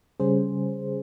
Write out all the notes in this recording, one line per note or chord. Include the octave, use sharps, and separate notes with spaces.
C#3 G3 C#4 G#4 C5